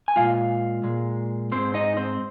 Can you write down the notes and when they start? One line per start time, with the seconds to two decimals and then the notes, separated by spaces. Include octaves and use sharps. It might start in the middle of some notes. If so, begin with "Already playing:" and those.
0.08 G#5
0.16 A#2 G#3 F4 F5
0.83 A#2 G#3
1.52 G#2 G#3 C4 C5
1.74 D#4 D#5
1.97 C4 C5